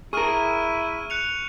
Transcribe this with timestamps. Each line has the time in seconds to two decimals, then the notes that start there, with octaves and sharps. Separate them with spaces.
0.13 E4 G#4 A#4 C#6 F6 D#7
1.10 F#6 C#7 F7